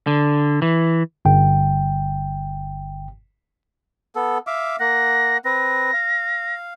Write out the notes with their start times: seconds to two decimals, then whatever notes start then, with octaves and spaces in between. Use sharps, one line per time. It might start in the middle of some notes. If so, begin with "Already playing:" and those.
0.07 D3
0.62 E3
1.25 G1 G5
4.16 B3 A4
4.47 E5 F5 D6
4.80 A#3 F#5 A#6
5.45 C4 B4 A#6
5.93 F5